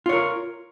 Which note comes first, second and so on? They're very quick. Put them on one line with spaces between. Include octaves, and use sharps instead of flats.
F4 C#5 A#4